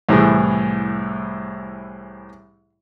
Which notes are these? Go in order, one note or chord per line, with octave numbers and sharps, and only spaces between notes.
C2 A2 E3 G#4